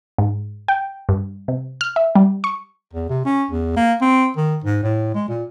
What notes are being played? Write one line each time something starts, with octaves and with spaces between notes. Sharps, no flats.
G#2
G5
G2
C3
F6
E5
G3
C#6
E2
C3
C#4
E2
A#3
C4
D#3
G#2
A2
G#3
A#2